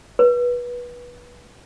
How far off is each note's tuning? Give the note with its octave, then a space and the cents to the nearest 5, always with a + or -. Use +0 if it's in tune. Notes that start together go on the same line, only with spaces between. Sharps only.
B4 -20